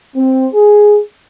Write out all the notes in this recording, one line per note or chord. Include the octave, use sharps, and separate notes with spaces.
C4
G#4